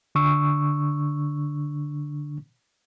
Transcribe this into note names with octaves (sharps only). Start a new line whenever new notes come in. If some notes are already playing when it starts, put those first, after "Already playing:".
D3 D4 C#6 E6